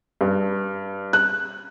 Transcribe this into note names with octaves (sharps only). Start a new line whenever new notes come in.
G2
F#6